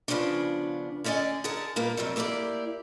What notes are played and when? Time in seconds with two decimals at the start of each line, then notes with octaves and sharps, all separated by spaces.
0.08 C#3 F3 G3 B3 C#4 D4
1.04 D3 C#4 D5 D#5 G#5
1.44 D3 G#4 A#4 F#5 A5
1.76 A#2 G3 A#3 B3
1.97 F2 C3 F#3 G3
2.16 A#3 E4 G4 B4 D5